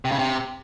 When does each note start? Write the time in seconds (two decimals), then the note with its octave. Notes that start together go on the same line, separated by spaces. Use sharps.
0.05 C3
0.12 C#3
0.19 C3